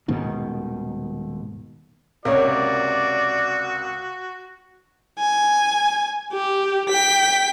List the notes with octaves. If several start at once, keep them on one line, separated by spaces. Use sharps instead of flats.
D#1 G#2 B2 D#3
C#2 C3 A#3 F#4 A#4 C#5 D5
G#5
G4
G5 B6